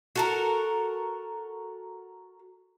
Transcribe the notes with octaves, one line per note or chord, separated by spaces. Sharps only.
F#4 A4 A#4